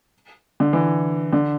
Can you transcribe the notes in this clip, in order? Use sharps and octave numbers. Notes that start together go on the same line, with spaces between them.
D3
E3
D3